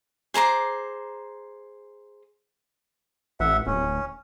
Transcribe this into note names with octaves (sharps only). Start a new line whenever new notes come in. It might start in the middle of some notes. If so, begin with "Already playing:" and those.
G#4 C5 A#5 D6
A1 E5 F#5
D1 C#4